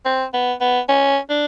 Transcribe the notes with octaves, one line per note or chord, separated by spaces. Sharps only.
C4
B3
B3
C#4
D4